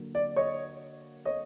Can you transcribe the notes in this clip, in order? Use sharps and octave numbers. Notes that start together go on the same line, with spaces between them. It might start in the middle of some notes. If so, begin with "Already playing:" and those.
Already playing: D3 F#3 A#3
D5
C#5 D#5
C#5 D#5